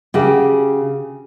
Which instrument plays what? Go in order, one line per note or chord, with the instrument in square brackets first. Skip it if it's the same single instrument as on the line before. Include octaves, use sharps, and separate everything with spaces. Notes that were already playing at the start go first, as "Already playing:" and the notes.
[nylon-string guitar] C#3 F#4 G4